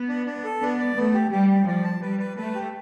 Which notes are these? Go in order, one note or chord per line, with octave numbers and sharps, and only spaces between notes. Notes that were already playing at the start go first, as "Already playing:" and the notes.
Already playing: B3
D4
D4
A4
B3 D4
D5
A3 B3
G4
G3 G4
G4
F3 D5
A5
G3 B4
B4
A3 B4
G4